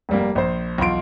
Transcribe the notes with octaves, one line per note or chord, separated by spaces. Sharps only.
F1 G3 A#3
A#1 C5
B1 E2 F4 C6 D7